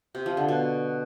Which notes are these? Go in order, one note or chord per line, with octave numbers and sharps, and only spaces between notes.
C3
F3
D3
B2